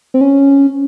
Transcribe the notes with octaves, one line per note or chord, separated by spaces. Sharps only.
C4
C#4